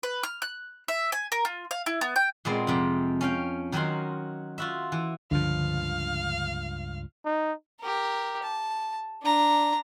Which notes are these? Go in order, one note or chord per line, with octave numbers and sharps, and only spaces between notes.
B4
F6
F#6
E5
G#5
A#4
F4
F5
E4
B3
G5
A#2 G#3 B3 C4
F2 C3 F3
C#4 F5 G5
D#3 F#3 C#4 F#4 A#4 C6
F4 F#4 E5
E3
C#2 G2 D3 F3 F5
D#4
G4 A#4
A5
D4 A#5